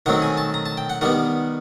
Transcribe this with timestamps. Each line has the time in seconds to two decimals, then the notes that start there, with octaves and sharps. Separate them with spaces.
0.06 D#3 F#3 A3 C4 F#5
0.22 G#5
0.38 A5
0.54 A#5
0.66 A5
0.78 G5
0.90 F#5
1.01 D#3 G3 B3 F#5